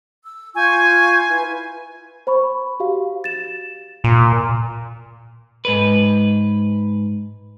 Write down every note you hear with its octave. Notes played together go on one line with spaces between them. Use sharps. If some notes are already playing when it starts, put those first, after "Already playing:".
E6
F4 G#5 C#6 G6
E4 B4
C5 B5 C#6
F#4 G4 F5
A6 E7
A#2
G#2 B4